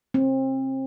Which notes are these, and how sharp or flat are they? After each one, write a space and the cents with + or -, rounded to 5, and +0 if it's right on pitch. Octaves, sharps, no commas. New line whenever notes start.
C4 +30